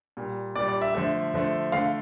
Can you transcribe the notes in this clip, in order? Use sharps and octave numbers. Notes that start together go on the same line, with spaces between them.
A#2 G3
A#2 G3 D5
D5
E5
D3 F3 A3 E5
D3 F3 A3
D3 A3 F5